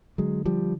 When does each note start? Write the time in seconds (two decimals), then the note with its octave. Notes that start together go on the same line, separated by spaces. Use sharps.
0.18 D3 F#3 G#3
0.45 F3 G3